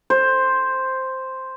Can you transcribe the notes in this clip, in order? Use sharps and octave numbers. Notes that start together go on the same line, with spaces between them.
C5